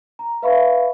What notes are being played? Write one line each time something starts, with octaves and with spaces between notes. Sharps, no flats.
A#5
B4 E5 F5 B5 C#6